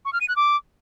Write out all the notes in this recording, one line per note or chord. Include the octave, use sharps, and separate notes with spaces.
C#6
F6
D#7
F#6
D6